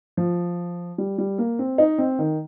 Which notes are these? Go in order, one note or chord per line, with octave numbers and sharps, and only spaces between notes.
F3
G3
G3
A#3
C4
D#4
C4
D#3